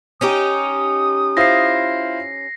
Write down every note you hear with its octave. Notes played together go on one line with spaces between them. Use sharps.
C#4 D#4 G4 D#6
E4 F4 C5 A#6 C7